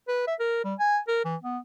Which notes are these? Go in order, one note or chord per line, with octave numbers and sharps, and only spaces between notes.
B4
E5
A#4
G3
G#5
A#4
E3
B3